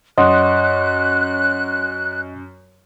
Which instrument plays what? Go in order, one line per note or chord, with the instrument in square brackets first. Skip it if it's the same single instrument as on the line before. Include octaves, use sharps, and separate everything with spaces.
[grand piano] F#2 [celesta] C#5 F#5 C6 [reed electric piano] D#5 [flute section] F#6